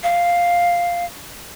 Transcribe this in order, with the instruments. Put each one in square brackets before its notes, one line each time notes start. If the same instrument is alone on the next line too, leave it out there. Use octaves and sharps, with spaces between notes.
[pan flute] F5